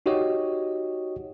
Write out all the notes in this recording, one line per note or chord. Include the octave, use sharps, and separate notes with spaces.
D#4 F#4 G4 C#5 D#5